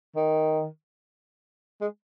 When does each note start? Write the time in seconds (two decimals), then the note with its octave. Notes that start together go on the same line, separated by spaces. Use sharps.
0.16 D#3
1.81 G#3